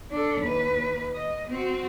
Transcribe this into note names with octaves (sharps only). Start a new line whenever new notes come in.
D4 A4
D#2 B4
D#5
C4 F#4